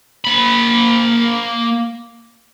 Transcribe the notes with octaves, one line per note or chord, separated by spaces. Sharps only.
A#3 B5